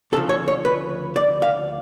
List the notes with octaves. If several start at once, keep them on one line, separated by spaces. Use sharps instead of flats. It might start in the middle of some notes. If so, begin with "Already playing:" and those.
D2 C#3 F3 A4
C#5
C#5
B4
D5
F5